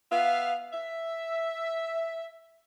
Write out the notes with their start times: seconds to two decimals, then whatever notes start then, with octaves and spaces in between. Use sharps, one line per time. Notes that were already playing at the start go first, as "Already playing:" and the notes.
0.11 B3 E5 F5
0.72 E5